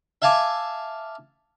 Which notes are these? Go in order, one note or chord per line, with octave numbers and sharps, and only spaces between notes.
E5 F5 G#5 A5 D6